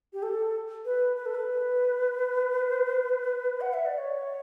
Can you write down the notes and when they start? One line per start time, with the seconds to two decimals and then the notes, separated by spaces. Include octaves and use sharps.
0.13 G4
0.23 A4
0.85 B4
1.16 B4
1.26 A4
1.35 B4
3.61 F#5
3.74 E5
3.86 D5
3.98 C#5